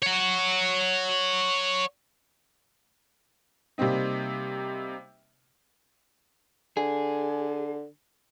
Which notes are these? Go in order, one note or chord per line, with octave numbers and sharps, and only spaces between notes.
C#5 F#5
C3 G3 A#3 C4 D#4
D3 G#4